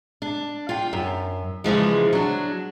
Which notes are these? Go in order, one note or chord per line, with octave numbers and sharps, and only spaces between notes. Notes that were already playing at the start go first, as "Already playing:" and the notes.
D4
F4 G5
F#2
C#3 E3 F3 G#3
F#3 D4